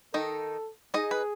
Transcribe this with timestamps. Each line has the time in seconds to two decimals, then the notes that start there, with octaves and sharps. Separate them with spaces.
0.14 D#3 D#4 A4
0.94 D#4 G#4 D#5
1.11 B4